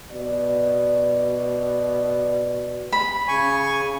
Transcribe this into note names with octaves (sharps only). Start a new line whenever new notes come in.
B2 D5
B5
C#3 G#5 C#6